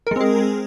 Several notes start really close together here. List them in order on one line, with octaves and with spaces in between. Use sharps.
A#4 G#3 C4 G#4